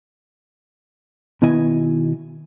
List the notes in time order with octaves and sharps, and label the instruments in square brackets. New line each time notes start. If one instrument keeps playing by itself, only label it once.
[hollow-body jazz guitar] B2 D#3 B3 E4 D#5 G#5